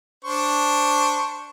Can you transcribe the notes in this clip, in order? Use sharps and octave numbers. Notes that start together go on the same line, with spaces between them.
D4 C5 C#6